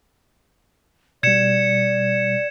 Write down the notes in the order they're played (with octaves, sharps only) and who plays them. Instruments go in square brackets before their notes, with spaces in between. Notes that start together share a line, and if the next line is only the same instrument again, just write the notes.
[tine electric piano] B2 G3 [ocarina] D5 [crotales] G#6 C#7 E7